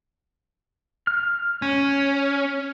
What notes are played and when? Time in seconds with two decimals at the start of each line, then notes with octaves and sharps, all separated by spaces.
1.07 F6
1.62 C#4 C#5